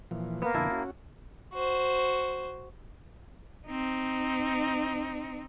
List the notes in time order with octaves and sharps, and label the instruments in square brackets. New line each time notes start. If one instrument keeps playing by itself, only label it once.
[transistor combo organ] A#2 E3 F3
[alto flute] A#3 [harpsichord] B3
[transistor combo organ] F2 B2 D3 [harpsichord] E4 A5
[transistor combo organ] C#4 F#4
[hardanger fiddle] F#4 C5
[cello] C4 D#4